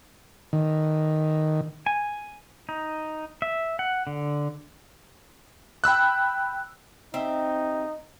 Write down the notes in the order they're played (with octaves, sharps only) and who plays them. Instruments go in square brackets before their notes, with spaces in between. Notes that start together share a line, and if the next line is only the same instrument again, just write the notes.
[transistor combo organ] D#3
[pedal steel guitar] G#5
D#4
E5
F#5
D3
[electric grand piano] G5 B5 E6 F#6
[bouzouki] C4 G4 E5 [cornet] D#4